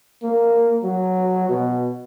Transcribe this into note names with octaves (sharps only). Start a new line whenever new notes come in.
A#3
F#3
B2